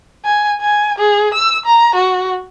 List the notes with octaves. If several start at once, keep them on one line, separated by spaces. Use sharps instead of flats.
G#5
G#5
G#4
E6
A#5
F#4